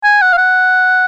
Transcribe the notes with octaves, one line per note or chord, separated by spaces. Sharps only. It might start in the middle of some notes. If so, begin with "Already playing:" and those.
G#5
F#5
F5
F#5